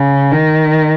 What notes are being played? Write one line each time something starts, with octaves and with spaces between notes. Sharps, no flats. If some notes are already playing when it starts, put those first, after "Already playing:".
Already playing: C#3
D#3